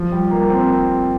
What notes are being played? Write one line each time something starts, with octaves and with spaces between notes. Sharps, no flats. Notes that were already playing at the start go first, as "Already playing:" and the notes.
Already playing: F3
G3
A#3
C4